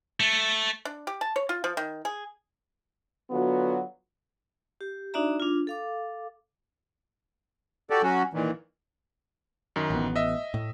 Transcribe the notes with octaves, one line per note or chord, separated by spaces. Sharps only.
A3
D4
G4
A5
C#5
F4
F3
D#3
G#4
D3 F#3 B3 F4 F#4
G4
D4 D#4 F#4 D5 E5 A#5
D4 F4
A4 F5 D6
F#4 G4 A4 D5
F#3 C#4 F#4
A#2 D#3 E3
F#2 D#3
A1 B3
D#5 E5
A2